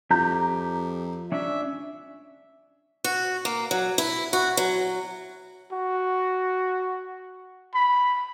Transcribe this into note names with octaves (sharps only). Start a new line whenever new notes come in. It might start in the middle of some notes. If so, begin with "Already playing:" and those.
F2 G4 A#5 G6
C#4 D4 E5
F#4
A#3
F#3
E4
F#4
F#3
F#4
B5